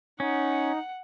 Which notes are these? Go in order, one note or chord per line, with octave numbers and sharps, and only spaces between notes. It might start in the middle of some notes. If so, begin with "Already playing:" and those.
C#4 D#4 F#5